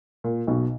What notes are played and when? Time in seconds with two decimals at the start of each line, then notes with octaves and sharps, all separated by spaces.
0.24 A#2
0.47 B1 B2